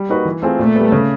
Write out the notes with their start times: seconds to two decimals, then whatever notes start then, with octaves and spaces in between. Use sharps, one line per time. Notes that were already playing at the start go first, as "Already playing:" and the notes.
Already playing: G3
0.09 A#3 D#4 F#4 B4
0.25 E3
0.42 A3 C4 F4 G#4
0.59 A#2 A3
0.76 G3 B3
0.92 C#3